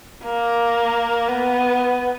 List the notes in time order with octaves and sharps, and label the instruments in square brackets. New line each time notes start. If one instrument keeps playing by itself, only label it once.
[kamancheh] A#3
B3